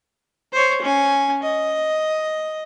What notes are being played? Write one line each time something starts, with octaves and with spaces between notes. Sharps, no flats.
C5 C#5
C#4 G#5
D#5